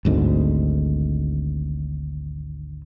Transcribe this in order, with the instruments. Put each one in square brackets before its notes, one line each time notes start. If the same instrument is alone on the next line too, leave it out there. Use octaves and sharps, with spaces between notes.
[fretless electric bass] G#1 D2 G#2